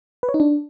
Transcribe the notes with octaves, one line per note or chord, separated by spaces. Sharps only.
B4
C#5
D#4
D4